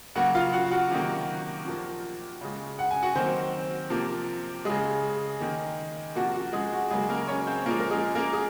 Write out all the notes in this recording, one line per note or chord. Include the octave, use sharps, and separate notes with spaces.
C#3 F#3 A#3 F#4 F#5
F4 F5
F#4 F#5
F#4 F#5
C3 D#3 F#3 A#3
A#2 F3 A#3
C#3 G#3
F#5
G#5
F#4 F#5
D#3 F#3 A#3 C4 C5
C3 F3 A#3
C#3 G#3 G#4
D#3 A#3
C3 F3 A#3 F#4
F#4
G#3 G#4
F#4
C#3 F#3 G#3 A#3 G#4
A#3 A#4
C#4 C#5
C4 C5
A#2 F3 G#3 A#3 A#4
A#4
G#3 G#4
A#3 A#4
G#4